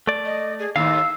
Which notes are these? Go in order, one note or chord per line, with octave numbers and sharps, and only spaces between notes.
A3 D5
D#5
G#4
D#2 A2 F5 E6